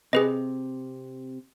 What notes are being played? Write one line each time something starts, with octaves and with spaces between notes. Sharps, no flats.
C3 G#4 B4 D#5